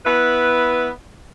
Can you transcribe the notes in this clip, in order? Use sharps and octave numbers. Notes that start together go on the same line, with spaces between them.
B3 E4 B4